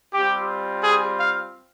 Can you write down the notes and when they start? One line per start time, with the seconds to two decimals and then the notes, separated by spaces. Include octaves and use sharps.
0.13 G3 C4 F4 G4
0.83 G#4
1.18 F5